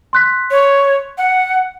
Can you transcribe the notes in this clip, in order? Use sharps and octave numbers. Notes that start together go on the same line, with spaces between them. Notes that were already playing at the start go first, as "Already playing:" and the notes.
C6 F#6 B6
C#5
F#5